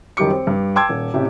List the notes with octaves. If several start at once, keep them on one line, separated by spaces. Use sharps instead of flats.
F#2 D#3 G3 G4 D6 C#7
C4
G2
G5 A5 C6 D6 E6 G#6
D#1
A1 C3 G4